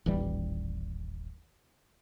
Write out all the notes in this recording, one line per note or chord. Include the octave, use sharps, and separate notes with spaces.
D#1 A1 E3 G3